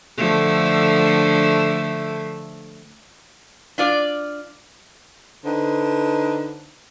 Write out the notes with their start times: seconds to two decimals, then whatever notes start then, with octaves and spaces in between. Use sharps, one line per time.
0.17 D3 F3 A3
3.78 D4 F4 D5
5.45 D3 D#4 B4 C5